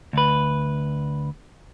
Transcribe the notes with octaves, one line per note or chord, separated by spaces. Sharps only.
D2 B4